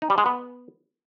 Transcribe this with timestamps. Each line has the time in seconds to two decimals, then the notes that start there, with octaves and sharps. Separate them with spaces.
0.02 D#4
0.10 G3
0.18 G#3
0.26 B3